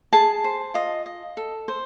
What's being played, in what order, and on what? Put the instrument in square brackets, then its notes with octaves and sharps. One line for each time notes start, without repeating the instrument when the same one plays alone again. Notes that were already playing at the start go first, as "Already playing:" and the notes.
[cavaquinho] G#4 A5
C5
F4 D#5
D#5
A4
C5